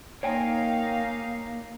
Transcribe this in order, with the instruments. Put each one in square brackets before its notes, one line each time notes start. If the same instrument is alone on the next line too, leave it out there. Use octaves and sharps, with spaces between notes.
[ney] A#3 [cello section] D#4 F5 [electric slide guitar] C#5 G5 G#5